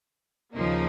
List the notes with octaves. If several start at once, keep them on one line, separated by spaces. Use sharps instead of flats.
D#2 C#3 F3 A#3 D#4